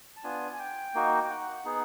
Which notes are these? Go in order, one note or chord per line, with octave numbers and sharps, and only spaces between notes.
A5
B3 D4 F4 G#5
G#5
G5
A#3 D#4 F#4
G5
F#5
B3 D#4 G#4